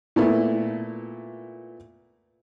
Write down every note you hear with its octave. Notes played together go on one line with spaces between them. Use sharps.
A#2 A3 B3 E4